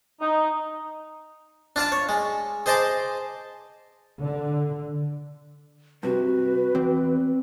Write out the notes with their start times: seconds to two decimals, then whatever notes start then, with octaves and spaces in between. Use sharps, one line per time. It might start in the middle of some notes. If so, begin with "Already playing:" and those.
0.21 D#4
1.76 D4 F4 D5 A5
1.92 C#5
2.09 G#3
2.66 G#4 C5 D#5 A5 C6 D6
4.20 D3
6.03 G2 C3 F#4 B4
6.75 E2 C4